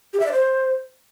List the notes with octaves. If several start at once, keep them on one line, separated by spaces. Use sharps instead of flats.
G4
E5
D5
C5